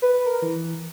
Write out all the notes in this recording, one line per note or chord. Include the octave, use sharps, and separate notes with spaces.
B4
A#4
E3